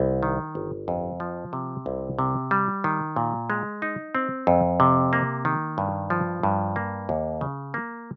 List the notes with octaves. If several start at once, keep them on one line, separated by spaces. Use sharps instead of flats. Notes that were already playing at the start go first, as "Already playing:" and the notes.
Already playing: C2
D#3
G1
F2
F3
C3
C2
C3
G3
D#3
A#2
G#3
D#4
C4
F2
C3
A#3
D#3
G2
F3
G2
A#3
D#2
C#3
A#3